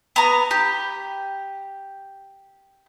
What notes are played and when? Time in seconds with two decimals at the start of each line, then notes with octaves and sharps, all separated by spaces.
0.16 B3 A#5
0.51 G4